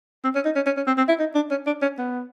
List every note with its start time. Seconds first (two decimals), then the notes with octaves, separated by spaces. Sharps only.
0.24 C4
0.35 C#4
0.45 D#4
0.56 C#4
0.66 C#4
0.77 C#4
0.87 C4
0.98 C4
1.09 E4
1.19 D#4
1.35 D4
1.51 C#4
1.67 D4
1.82 C#4
1.98 B3